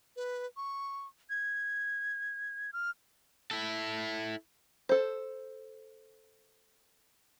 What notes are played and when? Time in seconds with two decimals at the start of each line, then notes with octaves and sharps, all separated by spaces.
0.16 B4
0.57 C#6
1.30 G#6
2.73 F6
3.51 E4 A4
4.89 A4 C5